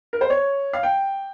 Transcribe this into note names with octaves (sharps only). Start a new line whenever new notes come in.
A#4
C5
C#5
F5
G5